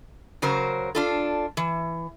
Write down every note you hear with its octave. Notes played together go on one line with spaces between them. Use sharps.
C#3 F#3 A#4 C5
D4 F4 A4
E3